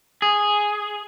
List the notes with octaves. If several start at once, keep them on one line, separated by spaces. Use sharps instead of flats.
G#4